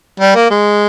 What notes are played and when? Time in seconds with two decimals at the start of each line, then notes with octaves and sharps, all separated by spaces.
0.20 G3
0.36 A#3
0.51 G#3